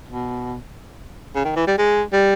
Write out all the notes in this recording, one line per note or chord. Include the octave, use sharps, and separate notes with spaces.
B2
C#3
D#3
E3
G3
G#3
G3